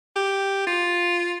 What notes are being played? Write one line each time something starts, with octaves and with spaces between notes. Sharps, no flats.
G4
F4